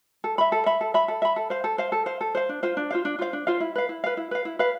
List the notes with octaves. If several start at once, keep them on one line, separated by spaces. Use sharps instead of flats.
A4
E5 B5
A4
E5 B5
A4
E5 B5
A4
E5 B5
A4
C5 F5
A4
C5 F5
A4
C5 F5
A4
C5 F5
D4
F4 C5 F5
D4
F4 C5 F5
D4
F4 C5 F5
D4
F4 C5 F5
E4
B4 F5
E4
B4 F5
E4
B4 F5
E4
B4 F5